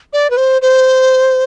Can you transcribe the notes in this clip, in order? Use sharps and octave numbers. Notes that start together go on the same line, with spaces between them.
D5
B4
C5
C5